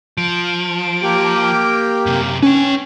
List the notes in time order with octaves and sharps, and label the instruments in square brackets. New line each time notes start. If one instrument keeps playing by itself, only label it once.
[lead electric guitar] F3 [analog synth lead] D7
[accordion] A#3 G4
[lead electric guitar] F#2 C3
[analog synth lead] C#4 [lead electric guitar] B4 G5